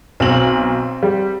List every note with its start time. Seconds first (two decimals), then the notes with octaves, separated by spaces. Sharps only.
0.20 B1 C4 F#7
1.03 G3